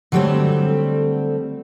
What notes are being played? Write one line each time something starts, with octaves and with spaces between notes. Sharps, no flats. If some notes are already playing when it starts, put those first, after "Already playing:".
D3 F#3 G3 A3 C4